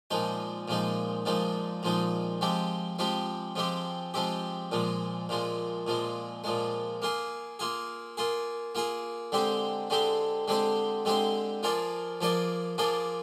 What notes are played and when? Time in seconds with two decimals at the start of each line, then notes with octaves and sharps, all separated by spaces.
0.11 A#2 F3 G#3 D#4
0.68 A#2 F3 G#3 D#4
1.25 A#2 F3 G#3 D#4
1.83 A#2 F3 G#3 D#4
2.41 F3 G#3 C4 G4
2.99 F3 G#3 C4 G4
3.56 F3 G#3 C4 G4
4.14 F3 G#3 C4 G4
4.71 A#2 F3 G#3
5.29 A#2 F3 G#3
5.87 A#2 F3 G#3
6.44 A#2 F3 G#3
7.02 A#3 F4 G#4
7.59 A#3 F4 G#4
8.17 A#3 F4 G#4
8.75 A#3 F4 G#4
9.32 D3 G#3 C4 G4 C5
9.90 D3 G#3 C4 G4 C5
10.48 D3 G#3 C4 G4 C5
11.05 D3 G#3 C4 G4 C5
11.63 F3 A#3 F4 G#4 D5
12.21 F3 A#3 F4 G#4 D5
12.78 F3 A#3 F4 G#4 D5